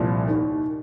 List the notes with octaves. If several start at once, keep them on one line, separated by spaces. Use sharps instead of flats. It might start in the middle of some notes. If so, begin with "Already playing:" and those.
Already playing: C2 A#2 F3
D#2 D#3